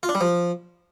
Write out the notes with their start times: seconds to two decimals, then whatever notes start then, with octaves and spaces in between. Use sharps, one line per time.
0.03 F4
0.09 D4
0.15 G3
0.21 F3